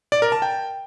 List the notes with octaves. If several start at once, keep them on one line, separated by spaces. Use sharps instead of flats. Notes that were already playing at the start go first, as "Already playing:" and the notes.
D5
A#4
A5
G5